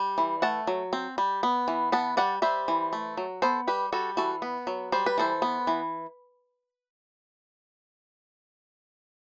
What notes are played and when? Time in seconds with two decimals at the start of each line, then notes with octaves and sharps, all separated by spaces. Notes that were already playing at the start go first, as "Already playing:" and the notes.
Already playing: G3
0.18 E3
0.42 A3 F#5 A5
0.67 F#3
0.93 C4
1.18 G3
1.43 B3
1.68 E3
1.92 B3 F#5 A5
2.17 G3 D5 F#5
2.42 G3 C5 E5
2.68 E3
2.93 A3
3.17 F#3
3.42 B3 A4 C5
3.67 G3 G4 B4
3.92 G3 F#4 A4
4.17 E3 F#4 A4
4.42 B3
4.67 F#3
4.92 G3 C5
5.06 B4
5.18 E3 A4 C5
5.42 B3
5.67 E3